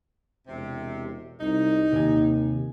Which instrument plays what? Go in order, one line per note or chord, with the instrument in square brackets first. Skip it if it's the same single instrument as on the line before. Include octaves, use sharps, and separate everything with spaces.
[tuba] E1 [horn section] C3
[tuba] C2 [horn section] D#4
[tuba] D#2 [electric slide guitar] C3 D5 G#5